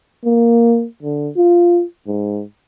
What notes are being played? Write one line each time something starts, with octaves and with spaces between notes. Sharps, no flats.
A#3
D3
F4
G#2